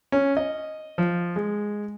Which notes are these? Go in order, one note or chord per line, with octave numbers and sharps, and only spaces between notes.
C#4
D#5
F3
G#3